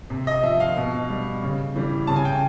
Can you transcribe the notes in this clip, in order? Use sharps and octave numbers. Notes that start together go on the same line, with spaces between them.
C3
D#5
F3 E5
F5
B2
G3
C#3
E3 G3
C#3 A5
G#5
G5